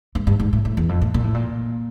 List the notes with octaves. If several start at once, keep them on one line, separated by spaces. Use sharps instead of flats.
G2
G2
G#2
A2
A2
E2
F2
A2
A#2
A2
A#2